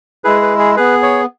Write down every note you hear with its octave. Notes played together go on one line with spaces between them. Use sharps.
G#3 E4 G#4 B4
B4
G#4
B3 G#4 B4
C#5